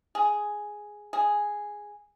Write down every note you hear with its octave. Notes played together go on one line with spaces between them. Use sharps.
G#4
G#4